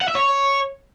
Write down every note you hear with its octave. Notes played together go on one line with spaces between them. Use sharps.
F#5
E5
C#5